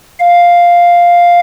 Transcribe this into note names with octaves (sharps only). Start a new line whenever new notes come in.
F5